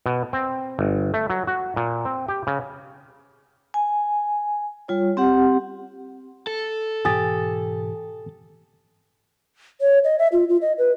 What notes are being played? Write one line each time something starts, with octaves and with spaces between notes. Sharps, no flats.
B2
C4
G1
A3
F#3
F#4
A#2
C4
G4
C#3
G#5
G3 F4 C#5
C4 G4 F#5
A4
G#2 B2 E3 G4 G#5 D#6 A6
C#5
D#5
E5
F4
F4
D#5
B4